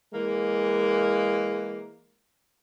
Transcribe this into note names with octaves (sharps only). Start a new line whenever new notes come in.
E3 G#3 A#3